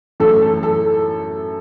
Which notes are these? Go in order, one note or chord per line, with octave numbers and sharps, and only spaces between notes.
F#2 E3 A3 A4
A4
A4